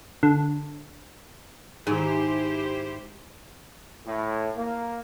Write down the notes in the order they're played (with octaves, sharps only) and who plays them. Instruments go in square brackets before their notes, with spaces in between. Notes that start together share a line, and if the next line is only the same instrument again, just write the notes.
[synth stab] D3
[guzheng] G#2 [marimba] D#3 G#4 [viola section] E4 G4 C5
[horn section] A2
A#3